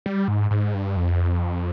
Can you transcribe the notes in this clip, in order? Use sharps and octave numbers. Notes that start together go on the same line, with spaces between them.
G3
G#2
G#2
G2
F2